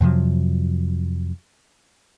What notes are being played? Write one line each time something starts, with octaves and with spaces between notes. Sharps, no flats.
F2 C3 F3 F#3